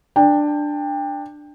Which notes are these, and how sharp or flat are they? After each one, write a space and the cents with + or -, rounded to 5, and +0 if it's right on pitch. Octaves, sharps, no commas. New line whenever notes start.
D4 +10 G5 +25